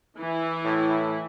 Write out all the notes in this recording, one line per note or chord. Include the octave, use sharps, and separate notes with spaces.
E3 E4
A2